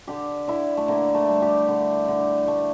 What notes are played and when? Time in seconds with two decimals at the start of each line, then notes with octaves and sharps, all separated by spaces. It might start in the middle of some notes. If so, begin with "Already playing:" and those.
0.08 D3 G4
0.48 D3 E4
0.77 A3
0.88 D3 A#3
1.14 A3
1.29 G3
1.42 G4
1.68 D3
2.08 D3
2.48 A3